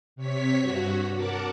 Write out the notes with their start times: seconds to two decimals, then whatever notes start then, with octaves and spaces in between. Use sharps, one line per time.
0.16 C3 C#5 B6
0.59 G2 F#4
1.15 A#4 F#5 A5 D6